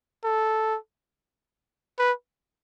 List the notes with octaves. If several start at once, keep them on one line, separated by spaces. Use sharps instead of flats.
A4
B4